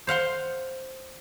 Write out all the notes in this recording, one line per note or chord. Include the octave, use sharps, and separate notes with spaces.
C5 F5 F#5 C6